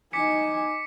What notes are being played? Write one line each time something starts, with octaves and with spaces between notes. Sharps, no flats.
D#4 G#5 D6 B6 C#7